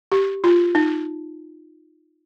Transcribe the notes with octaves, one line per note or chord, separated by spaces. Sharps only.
G4
F4
D#4